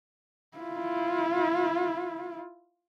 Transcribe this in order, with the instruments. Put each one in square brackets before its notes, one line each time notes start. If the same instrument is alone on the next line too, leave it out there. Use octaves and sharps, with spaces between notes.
[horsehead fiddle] E4 F4